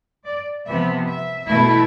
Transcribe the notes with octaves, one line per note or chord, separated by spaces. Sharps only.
D5
C3 F3 B3 E5
E5
B2 A3 E4